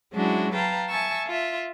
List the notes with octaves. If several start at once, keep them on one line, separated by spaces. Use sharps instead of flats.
F#3 G#3 C#4 D4 E4 F#4
B4 F5 G5 A5 A#5
E5 G#5 A5 C#6 E6
F4 E5